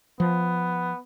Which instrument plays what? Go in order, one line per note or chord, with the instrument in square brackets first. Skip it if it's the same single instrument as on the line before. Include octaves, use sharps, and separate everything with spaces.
[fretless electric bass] F3 [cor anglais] B3